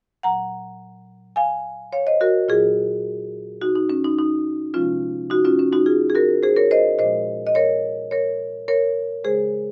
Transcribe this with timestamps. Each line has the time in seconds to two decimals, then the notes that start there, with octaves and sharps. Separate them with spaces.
0.23 A#2 F#3 F#5 A#5
1.36 F5 G#5
1.93 C#5 F5
2.07 C5 D#5
2.21 F#4 A#4
2.48 A#2 F#3 F4 G#4
3.61 D#4 F#4
3.75 D#4
3.90 C#4
4.04 D#4
4.18 D#4
4.74 C3 F3 G#3 C#4 F4
5.30 D#4 F#4
5.45 C#4 F4
5.59 C#4
5.72 D#4 F#4
5.86 F4 G#4
6.10 G#4
6.15 F#4 A#4
6.43 G#4 C5
6.56 A#4 C#5
6.71 C5 D#5
6.99 A#2 F3 G#3 C5 D#5
7.47 D#5
7.55 A#4 C#5
8.11 A#4 C#5
8.68 A#4 C#5
9.24 C#3 G#3 G#4 C5